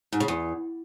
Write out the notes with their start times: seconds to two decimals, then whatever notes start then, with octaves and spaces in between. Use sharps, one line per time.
0.13 G#2
0.20 C#3
0.28 E2